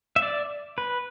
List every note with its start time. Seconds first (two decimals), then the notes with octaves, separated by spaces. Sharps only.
0.16 E5
0.22 D5
0.78 B4